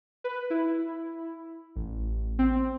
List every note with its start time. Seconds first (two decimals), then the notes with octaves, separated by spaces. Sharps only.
0.24 B4
0.50 E4
1.76 A1
2.39 C4